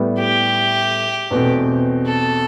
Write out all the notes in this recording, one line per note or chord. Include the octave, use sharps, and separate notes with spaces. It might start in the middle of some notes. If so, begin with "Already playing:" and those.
Already playing: A2 G3 B3
G4
E2 B2 A3 C4
A4